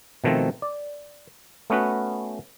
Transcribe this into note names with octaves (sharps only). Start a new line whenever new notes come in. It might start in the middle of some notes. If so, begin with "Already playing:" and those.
B2 D#3 F3 A3 C4
D5
A3 B3 C#4 F#4 B4